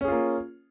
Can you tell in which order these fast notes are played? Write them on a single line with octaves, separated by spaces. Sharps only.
C#4 G#4 F4 A#3